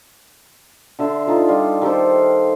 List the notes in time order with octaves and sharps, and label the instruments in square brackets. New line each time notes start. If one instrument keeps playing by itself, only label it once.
[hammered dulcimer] D3 E5 A5 C6
D#4 F4 A4
G3 F4
D#3 G4 A4 C5